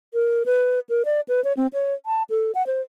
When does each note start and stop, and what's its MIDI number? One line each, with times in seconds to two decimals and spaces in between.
0.14 0.43 70
0.46 0.80 71
0.89 1.03 70
1.05 1.21 74
1.28 1.43 71
1.44 1.53 73
1.57 1.67 60
1.73 1.94 73
2.06 2.23 81
2.30 2.52 69
2.55 2.65 78
2.67 2.81 72